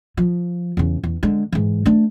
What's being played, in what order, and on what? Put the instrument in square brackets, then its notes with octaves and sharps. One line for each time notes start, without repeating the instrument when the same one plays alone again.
[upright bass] F3
E2 C#3
E2
D3 G#3
G#2 E3
A3 D4